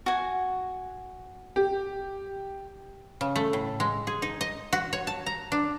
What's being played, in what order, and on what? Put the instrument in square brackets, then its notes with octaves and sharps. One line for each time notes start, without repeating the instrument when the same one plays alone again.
[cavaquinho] F#4 G#5
[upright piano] G4
[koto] C#3
A3
A2
G#3
G#4
D#4
D#5
F#4
C#5
A5
A#5
D4